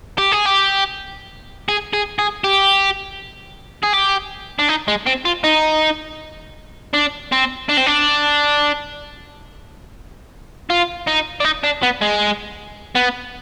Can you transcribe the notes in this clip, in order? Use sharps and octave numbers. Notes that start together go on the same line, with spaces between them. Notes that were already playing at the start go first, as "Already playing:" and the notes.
G4
G#4
G4
G#4
G#4
G#4
G4
G#4
G4
D4
D#4
G#3
C4
F4
D#4
D4
C4
D4
C4
D4
F4
D#4
D4
D#4
D4
B3
G#3
B3